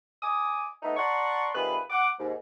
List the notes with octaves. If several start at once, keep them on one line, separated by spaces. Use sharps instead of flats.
G#5 D6 D#6
A3 B3 D#4
D5 F#5 A5 A#5 C6 C#6
C3 D#3 G3 F4 G#4 B4
F#5 D6
D#2 G#2